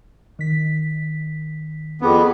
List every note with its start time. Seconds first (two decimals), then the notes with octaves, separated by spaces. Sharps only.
0.39 D#3 B6
2.01 F2 B3 C4 G#4 D6